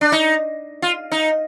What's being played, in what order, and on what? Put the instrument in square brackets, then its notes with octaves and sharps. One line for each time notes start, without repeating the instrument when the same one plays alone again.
[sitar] D4
D#4
F4
D#4